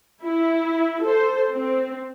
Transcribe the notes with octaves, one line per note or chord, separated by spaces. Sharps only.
E4
A4 C5
C4